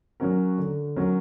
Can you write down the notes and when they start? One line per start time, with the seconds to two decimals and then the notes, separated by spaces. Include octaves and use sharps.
0.20 F#3 C#4 F#4 A#4
0.58 D3
0.96 F#3 C#4 F#4 A#4